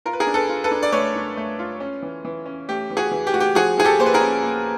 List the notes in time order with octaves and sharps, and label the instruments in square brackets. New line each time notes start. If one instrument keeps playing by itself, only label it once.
[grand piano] F4 A#4
B4
G#4 A#4
D4
A4 B4
F4
A4 B4
D4
D5
A3 B4 C#5
D4
A3
F4
C#4
E3
E3
C#4
A3 G4
E3
F#4 G#4
E3
G4
A3 F#4
G4
F3 F#4 G#4
F3 G#4
G4 A4
A#3 C5
B4
G#4 A#4
C#4
A#3